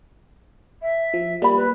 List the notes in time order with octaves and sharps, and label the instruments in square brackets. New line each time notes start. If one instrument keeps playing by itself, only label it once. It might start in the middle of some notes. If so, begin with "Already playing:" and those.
[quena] E5
[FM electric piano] F3
[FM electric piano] G3 A#3 [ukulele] D5 B5
[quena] B4